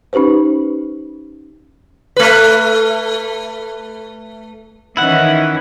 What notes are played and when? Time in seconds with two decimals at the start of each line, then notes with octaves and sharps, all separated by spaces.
0.13 C#4 D#4 G4 B4 C5
2.17 A3 B4
4.97 D#3 E3 C#4 E4 F#5